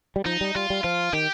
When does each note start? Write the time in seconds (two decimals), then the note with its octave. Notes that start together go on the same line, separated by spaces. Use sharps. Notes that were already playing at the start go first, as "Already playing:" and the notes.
0.16 G3
0.26 F3 D#4
0.41 G3
0.55 G3 F4
0.70 G3
0.84 F3 F4
1.13 D#3 G4